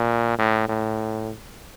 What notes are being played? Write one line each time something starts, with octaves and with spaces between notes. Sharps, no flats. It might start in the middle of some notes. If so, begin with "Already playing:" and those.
Already playing: A#2
A2
A2